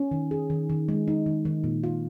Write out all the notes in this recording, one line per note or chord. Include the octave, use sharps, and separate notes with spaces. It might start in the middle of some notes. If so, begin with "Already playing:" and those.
Already playing: C#4
D#3
G#4
D#3
D#3
G#3
D#4
D#3
D#3
A#2
F4